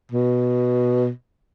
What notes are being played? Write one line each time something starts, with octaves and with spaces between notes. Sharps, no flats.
B2